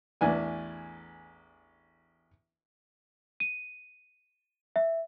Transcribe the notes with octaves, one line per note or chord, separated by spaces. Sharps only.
A1 E2 D4 G#5
D#7
E5